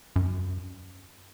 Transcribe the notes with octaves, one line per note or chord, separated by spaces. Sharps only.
F#2